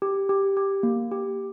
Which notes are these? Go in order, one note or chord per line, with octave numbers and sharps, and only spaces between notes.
G4
G4
G4
A#3
G4